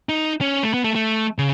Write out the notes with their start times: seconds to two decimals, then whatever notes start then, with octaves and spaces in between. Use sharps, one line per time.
0.09 D#4
0.41 C#4
0.63 A3
0.74 B3
0.84 A3
0.96 A3
1.38 C#3